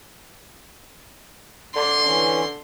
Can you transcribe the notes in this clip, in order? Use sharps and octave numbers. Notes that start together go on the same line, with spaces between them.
D3 D4 D5 C6
E3 C#4